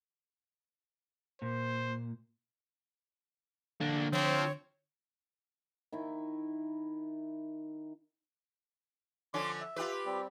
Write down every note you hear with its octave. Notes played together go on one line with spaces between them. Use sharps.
A#2 C5
D3 A#3 D4
F3 C4 C#5
D#3 E4
D3 F3 C#4 C6 D6
E5
F4 G4 B4
G3 C4